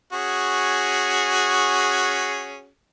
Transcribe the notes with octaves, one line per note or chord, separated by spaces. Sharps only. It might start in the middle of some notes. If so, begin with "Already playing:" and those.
C#4 F#4 G#4